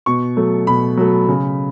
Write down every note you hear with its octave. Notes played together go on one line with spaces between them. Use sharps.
B2 C#6
F#3 A3
B2 B5
F#3 A3
C#3